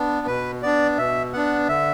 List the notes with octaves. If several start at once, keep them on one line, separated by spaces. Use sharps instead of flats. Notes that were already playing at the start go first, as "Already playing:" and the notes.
Already playing: B3 D4
B2 B4
B3 D4 D5
B2 E5
B3 D4 F#5
D3 E5